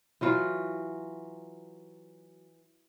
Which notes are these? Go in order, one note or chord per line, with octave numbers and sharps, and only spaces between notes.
E3 F#3 F4 F#4